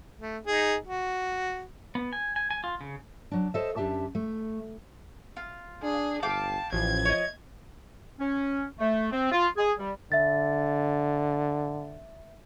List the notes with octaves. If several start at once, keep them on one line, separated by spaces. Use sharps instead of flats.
A3
D#4 G#4
F#4
B3
G#5
G#5
G#5
F4
C#3
F#3 D4
A4 C5 C#5 D#5 E5
F#2 D4 G4 E5 A5
A3
F4
D4 G#4
G1 F5 G5 A5 D6
A1 F3 G#6
C#5 D#5
C#4
A3
C4
F4
G#4
G3
D3 E5 A6